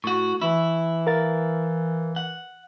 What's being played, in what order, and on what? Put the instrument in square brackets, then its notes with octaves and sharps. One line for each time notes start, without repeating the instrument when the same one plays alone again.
[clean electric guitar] A2 F#4 [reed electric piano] C#6
[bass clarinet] E3 [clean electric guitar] E4
[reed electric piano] A#4 F5 A6
[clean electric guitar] F#5